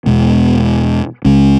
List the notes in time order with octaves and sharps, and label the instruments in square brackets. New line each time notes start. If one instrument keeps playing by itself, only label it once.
[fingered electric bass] E2 B2 G#3 B3
C#2 C#3 G#3 C#4